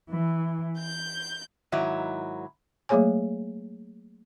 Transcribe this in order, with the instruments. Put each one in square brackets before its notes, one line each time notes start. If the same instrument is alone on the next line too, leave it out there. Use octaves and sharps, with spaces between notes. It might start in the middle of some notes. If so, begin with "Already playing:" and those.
[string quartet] E3
G6
[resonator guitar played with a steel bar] G#2 D#3 F#3 E4
[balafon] F#3 A3 A#3 G#4 C#5 G#5